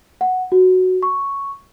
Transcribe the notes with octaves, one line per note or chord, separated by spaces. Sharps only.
F#5
F#4
C#6